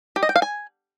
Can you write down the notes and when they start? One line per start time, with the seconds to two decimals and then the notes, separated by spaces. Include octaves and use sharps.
0.16 G4
0.23 D#5
0.29 G5
0.36 F5
0.42 G#5